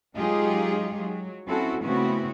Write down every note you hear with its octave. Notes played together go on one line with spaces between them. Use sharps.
F#3 G#3 D#4 F4 G4 G#4
F#3
C4 C#4 E4 F#4 A4
C#3 A3 B3 C4 E4 F#4